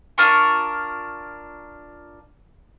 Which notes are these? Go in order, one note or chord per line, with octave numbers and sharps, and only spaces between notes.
D4 F4 A#4 C#6